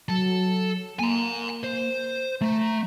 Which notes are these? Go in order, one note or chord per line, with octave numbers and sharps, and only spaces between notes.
F#3 A4
A#3 G#5 A#5
C5
A3 A#5